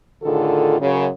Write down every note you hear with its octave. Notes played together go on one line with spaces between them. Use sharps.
A2 D3 D#3 F4 G#4 A4
F#2 C#3